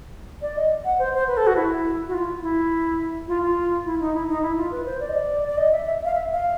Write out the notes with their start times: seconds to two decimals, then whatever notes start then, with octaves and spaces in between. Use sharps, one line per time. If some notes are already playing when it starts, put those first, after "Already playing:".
0.42 D5
0.56 D#5
0.85 F#5
0.99 C5
1.14 C5
1.28 B4
1.37 A4
1.47 F#4
1.56 E4
2.08 F#4
2.14 F4
2.42 E4
3.28 F4
3.42 F4
3.85 E4
4.00 D#4
4.14 E4
4.28 D#4
4.43 E4
4.57 F4
4.71 B4
4.86 C5
5.00 D5
5.09 D#5
5.15 D5
5.47 D5
5.58 D#5
5.72 E5
5.86 E5
6.05 F5
6.15 E5
6.33 F5